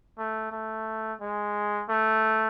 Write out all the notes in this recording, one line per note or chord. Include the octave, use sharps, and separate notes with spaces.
A3
A3
G#3
A3